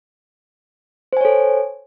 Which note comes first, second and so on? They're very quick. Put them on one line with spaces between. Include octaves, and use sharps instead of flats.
C5 G#5 C#5 A4